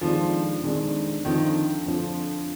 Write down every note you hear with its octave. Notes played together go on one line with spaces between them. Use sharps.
F2 D#3 F3 G#3 D4
F2 D#3 G#3 D4
F2 D3 D#3 F3
F2 D3 F3